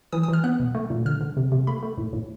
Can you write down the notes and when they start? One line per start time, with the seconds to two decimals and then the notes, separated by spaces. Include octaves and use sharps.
0.12 E3 D#6
0.23 D#6
0.28 E3 F6
0.44 B3 F#6
0.60 B2
0.75 A3
0.90 A#2
1.05 D3 F6
1.21 D3
1.37 C3
1.52 C3
1.67 A3 B5
1.83 A3
1.98 A2
2.13 A2